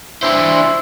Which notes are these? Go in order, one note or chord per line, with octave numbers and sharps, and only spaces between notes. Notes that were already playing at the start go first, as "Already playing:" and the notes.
D4 E4 C5